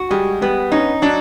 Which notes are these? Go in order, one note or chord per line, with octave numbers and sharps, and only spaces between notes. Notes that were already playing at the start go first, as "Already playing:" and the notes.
Already playing: F#4
G3 G#3
G3 B3
C#4 D#4
F#3 D4